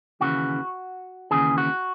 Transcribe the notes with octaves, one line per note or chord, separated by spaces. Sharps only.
D#2 C#3 E3 F#4
D#2 C#3 E3 G#4
F#4